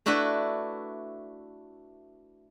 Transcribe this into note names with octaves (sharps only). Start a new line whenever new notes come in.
A3 D4 E4 F#4 B4